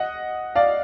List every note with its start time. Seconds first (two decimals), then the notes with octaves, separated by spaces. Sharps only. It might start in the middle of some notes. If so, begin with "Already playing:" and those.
Already playing: D#5 F#5
0.55 D5 F5